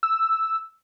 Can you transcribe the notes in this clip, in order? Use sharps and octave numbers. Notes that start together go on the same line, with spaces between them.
E6